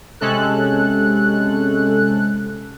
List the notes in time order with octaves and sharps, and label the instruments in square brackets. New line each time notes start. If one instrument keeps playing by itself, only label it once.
[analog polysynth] C3 G#3 C#4 A4 F#6